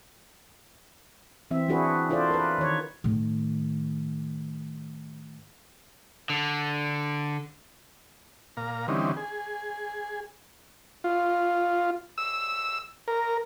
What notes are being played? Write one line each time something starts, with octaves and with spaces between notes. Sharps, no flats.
E3 C4 E5
D4 E4 F#4 G#4 B4 C5
D4 F4 A4 C5 D5
A#4 B4
D#3 C#5
A2 D#3
D3
A#2 F5 A#5
D3 E3 G3 C4 C#4 D#4
G#4
F4
E6
A#4